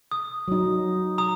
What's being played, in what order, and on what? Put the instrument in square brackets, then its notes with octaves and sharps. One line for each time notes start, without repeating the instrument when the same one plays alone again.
[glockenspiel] D#6
[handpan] F#3 D#4
[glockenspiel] A#5 D#6